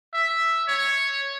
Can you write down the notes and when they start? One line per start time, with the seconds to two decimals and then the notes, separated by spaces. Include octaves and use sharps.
0.14 E5
0.68 C#5